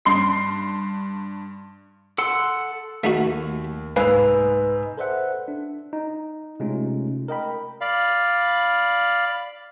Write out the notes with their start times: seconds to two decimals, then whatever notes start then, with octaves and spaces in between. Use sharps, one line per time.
0.05 G2 C6 C7
2.18 A4 F#5 C6
3.04 D#2 A3 D#4 F#4
3.96 C2 G#2 A#3 B4 G#5 E6 F7
4.97 A4 B4 C5 D5 E5 F#5
5.48 D4
5.93 D#4
6.60 C3 G#3 A3 C#4 D#4 F4
7.28 A#4 D#5 G5 B5
7.81 D5 F5 B5